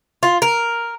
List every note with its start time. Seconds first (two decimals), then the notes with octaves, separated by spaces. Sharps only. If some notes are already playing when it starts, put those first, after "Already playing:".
0.23 F4
0.42 A#4